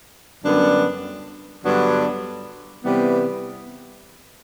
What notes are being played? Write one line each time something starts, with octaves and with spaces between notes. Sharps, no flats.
F#2 D3 G3 B3 D4
G2 D3 F#3 B3 D4
C3 E3 G3 B3